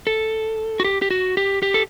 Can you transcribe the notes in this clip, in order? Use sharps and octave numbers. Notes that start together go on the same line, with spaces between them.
A4
F#4
G4
G4
F#4
G4
G4
A4